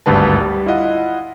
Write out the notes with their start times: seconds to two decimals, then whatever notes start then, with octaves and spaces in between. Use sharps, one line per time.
0.06 G#1 D2 G2 B4 A5
0.40 G3
0.66 E4 F4 D#5 F#5